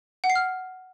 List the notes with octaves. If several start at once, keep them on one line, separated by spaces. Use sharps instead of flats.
F#5
C7
F6